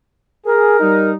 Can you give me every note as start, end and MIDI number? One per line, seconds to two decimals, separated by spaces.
0.46 0.77 68
0.46 1.10 70
0.80 1.14 55
0.80 1.14 63